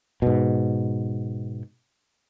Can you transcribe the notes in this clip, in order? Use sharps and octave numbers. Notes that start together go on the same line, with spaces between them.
G#2 B2